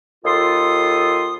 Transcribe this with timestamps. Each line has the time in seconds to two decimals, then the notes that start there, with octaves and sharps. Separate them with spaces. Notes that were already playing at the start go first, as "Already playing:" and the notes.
0.25 D#2 F4 A4 C6 D#6